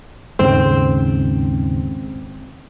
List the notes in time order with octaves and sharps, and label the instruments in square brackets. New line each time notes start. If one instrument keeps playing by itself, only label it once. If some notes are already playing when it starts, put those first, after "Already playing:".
[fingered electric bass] D#2 G#2 C#3 [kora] C4